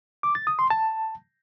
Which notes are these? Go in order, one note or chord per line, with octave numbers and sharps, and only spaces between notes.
D6
A6
D#6
C6
A5